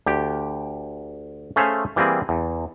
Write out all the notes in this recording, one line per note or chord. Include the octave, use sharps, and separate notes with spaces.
D2 G4
A3 C#4 G#4 C5 E5 F5
E3 G3 A#3 C4 G#4
E2